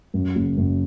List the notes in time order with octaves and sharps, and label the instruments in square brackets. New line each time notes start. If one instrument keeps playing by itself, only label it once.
[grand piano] F#2
F#1
F#2